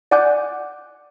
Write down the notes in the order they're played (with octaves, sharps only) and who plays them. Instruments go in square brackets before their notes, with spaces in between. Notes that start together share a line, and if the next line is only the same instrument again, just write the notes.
[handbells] D5 F#5 G#5 D6 F#6 G6